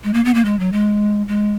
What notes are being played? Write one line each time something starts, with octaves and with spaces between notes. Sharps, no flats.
G#3
A#3
B3
A#3
G#3
F#3
G#3
G#3